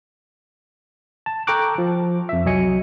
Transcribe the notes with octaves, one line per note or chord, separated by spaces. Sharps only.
A5
A4 G5 A#5 C#6 D6 F#6
F3
F2 E5
C2 F#3 F#4 D#5 G#5 C#7